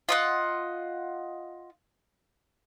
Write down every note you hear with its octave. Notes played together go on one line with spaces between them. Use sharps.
F4 D#5 F#5